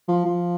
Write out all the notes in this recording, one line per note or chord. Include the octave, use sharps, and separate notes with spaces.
F3
F3